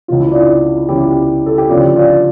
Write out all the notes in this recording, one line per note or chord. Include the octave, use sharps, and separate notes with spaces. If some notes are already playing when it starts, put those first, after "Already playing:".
C#2 C#3 E3 F4
E4
D4 F4
C#2 C#3 E3 E4 G4
A4
G4
D2 C#3 F3 D4 F4
D4 F4